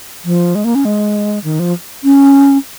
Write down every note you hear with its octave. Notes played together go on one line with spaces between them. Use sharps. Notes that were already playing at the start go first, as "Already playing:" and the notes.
F3
G#3
A#3
C#4
G#3
D#3
F3
C#4